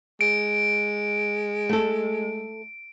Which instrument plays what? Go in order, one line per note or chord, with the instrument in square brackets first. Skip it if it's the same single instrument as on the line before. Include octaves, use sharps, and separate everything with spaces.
[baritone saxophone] G#3 [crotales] D7
[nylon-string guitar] A3 A4